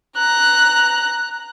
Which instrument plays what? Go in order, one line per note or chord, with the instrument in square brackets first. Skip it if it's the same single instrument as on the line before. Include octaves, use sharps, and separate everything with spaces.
[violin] A#5 F#6